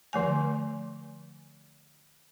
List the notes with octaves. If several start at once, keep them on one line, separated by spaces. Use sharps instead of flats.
D3 F3 A3 G#5